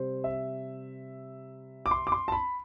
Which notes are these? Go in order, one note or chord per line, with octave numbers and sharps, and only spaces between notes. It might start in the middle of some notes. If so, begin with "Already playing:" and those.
Already playing: C3 G3 C4 C5
E5
D6
C6
D6
C6
A5
B5